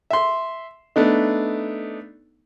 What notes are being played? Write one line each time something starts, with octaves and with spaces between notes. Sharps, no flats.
E5 C6
A3 B3 D4 D#4